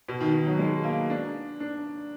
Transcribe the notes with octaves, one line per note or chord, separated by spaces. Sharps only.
B2
D#3
D#3
F#3
G#3
A#3
D4
D4